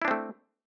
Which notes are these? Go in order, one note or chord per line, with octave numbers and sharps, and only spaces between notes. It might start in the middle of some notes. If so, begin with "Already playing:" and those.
A3 C4 D4 E4